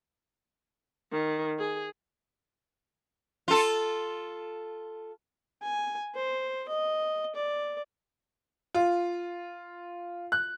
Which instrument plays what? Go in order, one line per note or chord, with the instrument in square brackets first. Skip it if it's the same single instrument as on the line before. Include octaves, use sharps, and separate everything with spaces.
[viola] D#3
G#4
[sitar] F4 A4
[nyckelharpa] G#5
C5
D#5
D5
[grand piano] F4
F#6